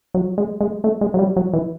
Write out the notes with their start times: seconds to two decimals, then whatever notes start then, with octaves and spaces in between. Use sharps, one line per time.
0.14 F#3
0.38 G#3
0.61 G#3
0.84 A3
1.01 G#3
1.14 F#3
1.19 G3
1.36 F#3
1.53 E3